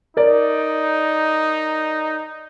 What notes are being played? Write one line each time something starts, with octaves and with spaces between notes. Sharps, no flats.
D#4 A#4 D5